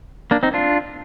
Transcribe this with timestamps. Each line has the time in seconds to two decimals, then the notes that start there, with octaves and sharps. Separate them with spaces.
0.31 A#3 D4
0.43 C4 D#4
0.54 D4 F4